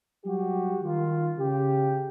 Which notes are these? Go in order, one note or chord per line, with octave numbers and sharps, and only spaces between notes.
F#3 G3 F#4 G4
D#3 F4
C#3 G4